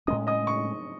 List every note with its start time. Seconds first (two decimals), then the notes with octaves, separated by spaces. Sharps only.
0.07 A2 G#3 C#4 D#5 D#6
0.27 D#5 D#6
0.47 C#6